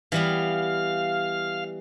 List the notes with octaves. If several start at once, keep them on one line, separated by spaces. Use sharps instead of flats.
E3 G3 B3 F5